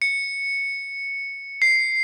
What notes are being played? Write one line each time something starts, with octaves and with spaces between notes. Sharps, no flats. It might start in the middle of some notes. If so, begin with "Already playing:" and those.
C#7
C7